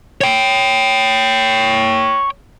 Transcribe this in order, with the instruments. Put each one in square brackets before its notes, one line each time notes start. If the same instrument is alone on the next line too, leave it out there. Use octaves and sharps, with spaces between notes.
[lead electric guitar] C#5 G5